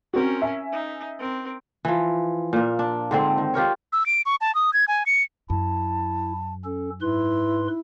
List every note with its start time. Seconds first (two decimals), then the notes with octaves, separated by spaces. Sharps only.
0.14 C4 C#4 F#4 A#4
0.42 E5 G#5
0.72 D#4
1.19 C4 A#4
1.85 E3 F3
2.53 A#2 A#3
2.79 D4
3.11 G#2 D3 C4 C5
3.38 D#3
3.54 F4 G4 A#4 C#5
3.93 E6
4.06 D7
4.26 C#6
4.41 A5
4.55 D#6
4.73 G#6
4.88 G#5
5.06 C#7
5.50 F#2 E4 A5
6.64 C#4 A4
7.02 G#2 E4 B4 C6